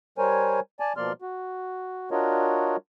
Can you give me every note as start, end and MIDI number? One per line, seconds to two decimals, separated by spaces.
0.18 0.60 55
0.18 0.60 70
0.18 0.60 72
0.18 0.60 73
0.18 0.60 80
0.80 0.93 74
0.80 0.93 80
0.80 0.93 81
0.97 1.12 47
0.97 1.12 53
0.97 1.12 58
0.97 1.12 74
0.97 1.12 84
0.97 1.12 89
1.22 2.09 66
2.11 2.76 62
2.11 2.76 65
2.11 2.76 66
2.11 2.76 70
2.11 2.76 73
2.11 2.76 75